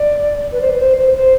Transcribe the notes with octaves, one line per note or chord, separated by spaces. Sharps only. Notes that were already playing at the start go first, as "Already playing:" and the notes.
Already playing: D5
B4
C5
B4
C5
C5
C5